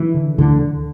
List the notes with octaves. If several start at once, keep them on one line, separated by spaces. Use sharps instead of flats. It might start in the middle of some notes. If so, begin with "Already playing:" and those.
Already playing: E3
D3
D2 D3
D3